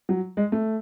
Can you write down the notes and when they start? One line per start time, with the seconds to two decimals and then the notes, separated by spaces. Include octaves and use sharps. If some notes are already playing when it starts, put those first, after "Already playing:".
0.09 F#3
0.37 G#3
0.52 A3